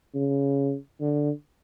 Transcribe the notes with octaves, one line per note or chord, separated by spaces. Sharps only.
C#3
D3